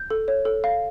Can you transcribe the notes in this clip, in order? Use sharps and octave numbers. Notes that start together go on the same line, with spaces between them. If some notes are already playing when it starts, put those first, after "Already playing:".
Already playing: G6
A4
C#5
A4
F5